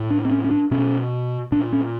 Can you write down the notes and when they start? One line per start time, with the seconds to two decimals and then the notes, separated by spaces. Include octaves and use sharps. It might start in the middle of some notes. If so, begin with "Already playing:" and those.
Already playing: A2
0.10 D4
0.25 C4
0.31 C#4
0.44 C#4
0.51 D4
0.71 B2 C#4
1.52 A#2 D4
1.73 C#4